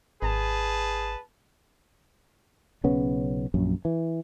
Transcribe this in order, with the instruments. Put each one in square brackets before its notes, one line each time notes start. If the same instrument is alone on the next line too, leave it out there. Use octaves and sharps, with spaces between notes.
[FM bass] G#1 [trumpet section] G#4 B4 A5
[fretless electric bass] B1 C#3 B3 C#4
A#1 F#2
E3